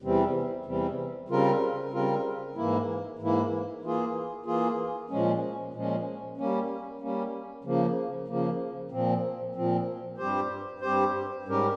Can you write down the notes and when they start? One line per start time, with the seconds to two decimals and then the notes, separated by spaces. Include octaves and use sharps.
0.02 E2 C3 E3 G3 C4
0.65 E2 C3 E3 G3 C4
1.28 C#3 G3 C4 F4 A#4
1.92 C#3 G3 C4 F4 A#4
2.56 G#2 E3 A#3 E4
3.19 G#2 E3 A#3 E4
3.83 E3 A#3 F4 G#4
4.46 E3 A#3 F4 G#4
5.10 A#2 F3 G#3 C#4
5.74 A#2 F3 G#3 C#4
6.37 G3 A#3 C#4
7.01 G3 A#3 C#4
7.64 C#3 F3 A#3
8.28 C#3 F3 A#3
8.91 A#2 F3 C4
9.55 A#2 F3 C4
10.18 G2 G3 C4 G4 C5
10.81 G2 G3 C4 G4 C5
11.45 G#2 G3 C#4 G4 A#4